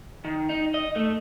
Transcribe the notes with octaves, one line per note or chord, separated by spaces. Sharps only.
D#3
D#4
D#5
A3